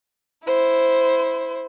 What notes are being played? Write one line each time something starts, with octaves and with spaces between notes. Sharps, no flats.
E4 C5